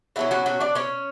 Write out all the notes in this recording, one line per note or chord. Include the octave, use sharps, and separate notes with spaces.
B2 F#3 C#4 E4
F#3 F#4
F#3 F#4
D4 D5
C#4 C#5